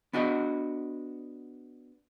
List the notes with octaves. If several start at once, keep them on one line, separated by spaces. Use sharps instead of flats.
B3 D4 F#4 D#5